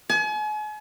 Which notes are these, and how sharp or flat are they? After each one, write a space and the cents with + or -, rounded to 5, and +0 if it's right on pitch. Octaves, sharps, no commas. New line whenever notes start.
G#5 +40